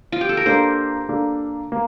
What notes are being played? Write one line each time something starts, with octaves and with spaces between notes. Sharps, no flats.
F4
G4
A4
A#4
A#3 D4 A4 C5
A#3 D4 A4
A#3